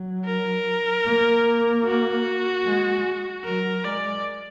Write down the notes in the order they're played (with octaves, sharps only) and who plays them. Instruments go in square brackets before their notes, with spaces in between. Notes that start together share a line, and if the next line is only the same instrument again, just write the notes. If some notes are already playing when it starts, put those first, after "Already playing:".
Already playing: [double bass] F#3
[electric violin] A#4
[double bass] A#3
[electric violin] F#4
[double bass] G#3
[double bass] F#3 [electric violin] A#4
[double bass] G#3 [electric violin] D5